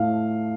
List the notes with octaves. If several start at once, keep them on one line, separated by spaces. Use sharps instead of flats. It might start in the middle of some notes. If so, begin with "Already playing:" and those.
Already playing: A2 F5